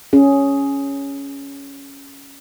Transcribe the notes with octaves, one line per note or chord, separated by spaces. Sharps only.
C#4 G#4